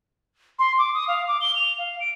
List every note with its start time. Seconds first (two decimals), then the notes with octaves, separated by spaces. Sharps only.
0.59 C6
0.78 D6
0.94 D#6
1.08 F5
1.28 D6
1.41 G7
1.56 F7
1.78 F5
2.00 D7